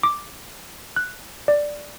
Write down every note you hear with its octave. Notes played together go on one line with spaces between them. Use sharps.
D6
F#6
D5